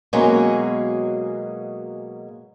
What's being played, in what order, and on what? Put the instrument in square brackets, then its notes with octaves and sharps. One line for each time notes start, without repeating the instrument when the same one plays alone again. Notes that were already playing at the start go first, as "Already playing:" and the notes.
[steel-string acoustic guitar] B2 F#3 G#3 A#3 C#4